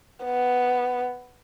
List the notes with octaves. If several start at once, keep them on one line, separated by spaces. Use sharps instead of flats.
B3